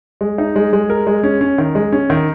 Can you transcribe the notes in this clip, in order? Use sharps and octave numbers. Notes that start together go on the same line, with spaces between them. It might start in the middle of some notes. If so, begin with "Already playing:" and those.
G#3
D#4
G#3
G#3
A#4
G#3
C#4
C#4
D#3
G#3
C#4
D#3